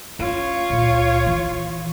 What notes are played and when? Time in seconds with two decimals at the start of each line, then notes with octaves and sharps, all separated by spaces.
0.19 C#4 F4 C#5
0.70 C#2 A#2
1.26 E3